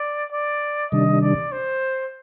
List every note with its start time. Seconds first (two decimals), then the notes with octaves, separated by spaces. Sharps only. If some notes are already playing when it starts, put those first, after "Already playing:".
Already playing: D5
0.32 D5
0.92 C3 D#3 G3 D4 D#5
1.22 D5
1.52 C5